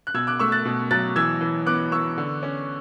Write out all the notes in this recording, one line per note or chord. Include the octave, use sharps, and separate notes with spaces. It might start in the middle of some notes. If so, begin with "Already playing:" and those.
F#6
B2 E6 G#6
D6 F#6
A3 C#6 E6
F#6 A6
B2
F#3 F#6 A6
E3 E6 G#6
E3
B3 D6 F#6
B3 C#6 E6
D3
C#4